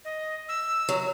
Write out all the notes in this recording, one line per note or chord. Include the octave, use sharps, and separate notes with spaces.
D#5
E6
F#3